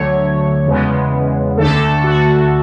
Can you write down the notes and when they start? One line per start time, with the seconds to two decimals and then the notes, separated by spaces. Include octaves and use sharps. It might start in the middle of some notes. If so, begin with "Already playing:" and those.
Already playing: D2 D3 F#3 A3 C#5
0.66 E2 C#3 G#3 B3
1.57 D2 D3 A3 A4
2.04 F#4